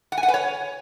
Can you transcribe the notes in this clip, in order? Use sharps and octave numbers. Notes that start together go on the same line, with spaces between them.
F#5
G#5
F#5
B4
C#5